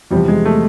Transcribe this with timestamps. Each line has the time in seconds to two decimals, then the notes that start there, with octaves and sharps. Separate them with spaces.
0.11 E2 C3 F3 G3
0.28 G#3
0.45 A3